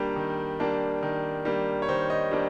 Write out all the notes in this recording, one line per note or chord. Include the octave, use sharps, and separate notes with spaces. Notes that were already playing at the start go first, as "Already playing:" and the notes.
Already playing: D#3 G3 A#3 D4
D#3
G3 A#3 D4
D#3
G3 A#3 D4
C#5
D#3 C5
D#5
G3 A#3 D4